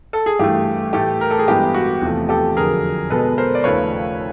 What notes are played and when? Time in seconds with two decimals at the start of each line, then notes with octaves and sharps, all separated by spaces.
0.13 A4
0.26 G#4
0.39 G2 E3 A3 G4
0.93 A2 E3 A3 G4 A4
1.21 A#4
1.31 A4
1.39 G#4
1.48 G2 E3 G#3 B3 G4
1.74 F#4
2.01 E2 C3 F3 A3
2.29 G4 A4
2.55 F2 D3 F#3 G#4 A#4
3.10 B2 G#3 B3 A4 B4
3.38 A#4 C5
3.55 D5
3.64 D#2 C#3 F3 A3 B4 C#5